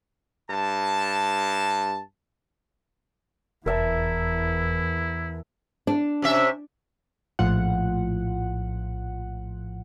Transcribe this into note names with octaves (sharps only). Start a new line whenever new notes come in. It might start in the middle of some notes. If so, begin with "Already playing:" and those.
G2 A5
F1 E2 E4 A#4 E5 A5
D4
C3 C#4 E5
A#1 A2 F3 F4 F#5